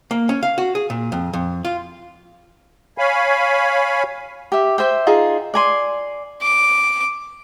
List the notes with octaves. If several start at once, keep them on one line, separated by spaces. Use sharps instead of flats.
A#3
C#4
F5
F#4
G#4
A#2
F2
F2
F4
C#5 F5 G#5 B5
G4 E5
C5 E5 G5
D#4 F4 G#4
D5 G#5 C6
D6